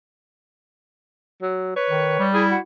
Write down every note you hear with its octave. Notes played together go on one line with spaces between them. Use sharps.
F#3
B4 C#5
D#3
G3
E4 G#4
F#4